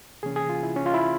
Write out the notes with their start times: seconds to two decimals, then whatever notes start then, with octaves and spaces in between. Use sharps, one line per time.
0.23 C3 E3 A#3 C#4 G#4
0.36 G#4
0.49 F4
0.63 E4
0.76 C#4
0.86 F4
0.94 E4